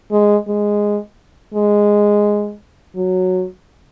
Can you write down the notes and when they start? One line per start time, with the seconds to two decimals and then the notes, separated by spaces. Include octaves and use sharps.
0.11 G#3
0.48 G#3
1.54 G#3
2.96 F#3